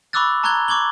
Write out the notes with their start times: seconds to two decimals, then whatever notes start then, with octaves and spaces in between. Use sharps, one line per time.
0.13 B5 C#6 D6 E6 F#6 A6
0.43 A5 A#5 C#6 F#6 G#6 G7
0.68 C#6 D6 G#6 F#7 G7